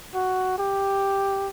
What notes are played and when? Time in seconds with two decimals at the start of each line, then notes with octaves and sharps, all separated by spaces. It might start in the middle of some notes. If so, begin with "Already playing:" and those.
0.15 F#4
0.58 G4